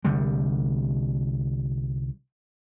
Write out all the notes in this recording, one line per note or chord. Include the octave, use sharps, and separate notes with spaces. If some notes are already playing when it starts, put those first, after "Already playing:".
C2 D3 G3